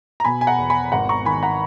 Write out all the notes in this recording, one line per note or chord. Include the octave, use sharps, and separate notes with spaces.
A#5
B2 G#5 B5
G#5
F#5 A#5
E2
G#5 B5
G#1 F#5 A#5
A#5 C#6
D#3 G#5 B5
F#5 A#5